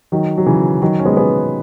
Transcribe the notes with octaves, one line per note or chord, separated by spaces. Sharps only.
D#3 F#3
F#3
C#3 E3
D#3 F#3
C#4
G#3 B3
G#3 B3